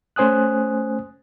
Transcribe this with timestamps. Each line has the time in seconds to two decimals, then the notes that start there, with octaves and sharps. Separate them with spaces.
0.16 A3 C#4 C5 G#5 D#6 F#6